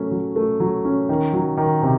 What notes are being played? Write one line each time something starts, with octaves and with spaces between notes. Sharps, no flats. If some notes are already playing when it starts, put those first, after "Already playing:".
Already playing: F#3 A3 C#4
F#3
A3
F#3
C#4
D#3
F#3
D#3
C3